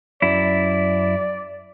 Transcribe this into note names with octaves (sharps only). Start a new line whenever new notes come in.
F#2 E4 D5